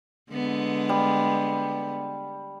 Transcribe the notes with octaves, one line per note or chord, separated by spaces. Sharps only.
D3 G#3 B3
G3